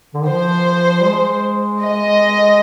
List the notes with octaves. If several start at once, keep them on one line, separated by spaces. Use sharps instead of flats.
D3
D#3
F3 C5
G3
G#3
D#5